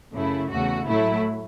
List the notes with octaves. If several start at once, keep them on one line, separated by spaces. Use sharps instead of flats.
F#2 C#3 A3 E4
E2 C#3 A3 F#4
A2 F#3 A3 E4